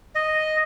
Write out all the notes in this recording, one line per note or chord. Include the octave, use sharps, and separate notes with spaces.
D#5